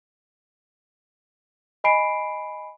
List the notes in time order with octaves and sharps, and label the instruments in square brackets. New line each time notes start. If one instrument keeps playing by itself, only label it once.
[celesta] D#5 G#5 B5 C7 D7